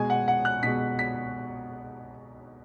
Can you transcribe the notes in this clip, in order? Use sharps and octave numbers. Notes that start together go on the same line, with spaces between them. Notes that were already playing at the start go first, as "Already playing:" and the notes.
Already playing: B2 G#3 G#5
F#5
F#5
F#6
B2 G#3 B6
B6